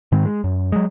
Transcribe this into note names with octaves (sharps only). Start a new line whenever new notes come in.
G#2 D#3 G#3 C4
G#3
F#2
F#3 G#3